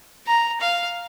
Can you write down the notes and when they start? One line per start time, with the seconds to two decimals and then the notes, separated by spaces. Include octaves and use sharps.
0.27 A#5
0.60 F5